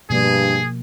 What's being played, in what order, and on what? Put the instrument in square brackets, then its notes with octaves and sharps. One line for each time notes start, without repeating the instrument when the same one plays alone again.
[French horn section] G2 [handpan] B2 F3 A#3 [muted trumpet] G#4